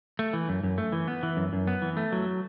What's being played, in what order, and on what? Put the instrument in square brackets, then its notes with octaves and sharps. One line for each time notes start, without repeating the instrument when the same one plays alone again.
[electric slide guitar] A3
E3
F#2
F#2
A3
E3
B3
E3
F#2
F#2
B3
E3
A3
F#3